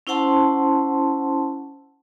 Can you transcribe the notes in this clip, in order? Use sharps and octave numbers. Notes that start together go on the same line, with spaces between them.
C#4 E4 C5 F#5 A5 C6